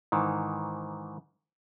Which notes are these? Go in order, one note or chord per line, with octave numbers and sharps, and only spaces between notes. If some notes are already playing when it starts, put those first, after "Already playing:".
G#2 D#3 E3